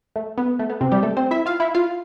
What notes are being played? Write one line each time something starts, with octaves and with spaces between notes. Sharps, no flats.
A3
B3
A3
B3
C3 C4
G3 G4
A3 A4
C4 C5
E4 E5
F4 F5
E4 E5
F4 F5